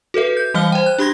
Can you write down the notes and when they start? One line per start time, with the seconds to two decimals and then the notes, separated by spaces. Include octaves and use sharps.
0.14 F#4 A4 B4 E5
0.37 G6
0.54 E3 G3 D#5 F5 F6 G7
0.72 C5 G5
0.86 F#6
0.98 D4 G4 B5 C6 G#6 A#6